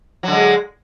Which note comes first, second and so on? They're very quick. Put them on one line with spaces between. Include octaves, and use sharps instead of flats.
F#3 D3 G#3